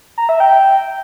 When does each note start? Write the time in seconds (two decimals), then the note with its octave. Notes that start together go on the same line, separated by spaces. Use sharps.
0.18 A#5
0.29 E5
0.40 G5